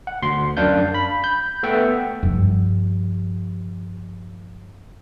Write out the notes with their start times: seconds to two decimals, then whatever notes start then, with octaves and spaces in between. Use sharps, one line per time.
0.07 F#5
0.22 D2 C6
0.57 F#2 D4 F5 G6
0.94 B5
1.24 G6
1.63 A3 B3 E5 F#5 G5
2.23 G2 F3